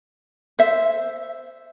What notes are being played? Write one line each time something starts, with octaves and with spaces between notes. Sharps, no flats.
C5 E5